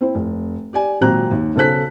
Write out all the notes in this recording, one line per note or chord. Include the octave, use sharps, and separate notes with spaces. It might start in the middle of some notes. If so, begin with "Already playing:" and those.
C4 E4 C5
F1
G4 D5 G#5
G#1 A#2 F#3 C4 A#5 F#6
D#2
B1 C#3 A4 C5 F#6 B6